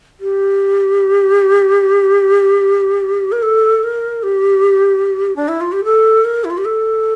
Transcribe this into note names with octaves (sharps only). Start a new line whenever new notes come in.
G4
A#4
A4
A#4
G4
D4
E4
F4
G4
A4
A#4
E4
F4
G4
A4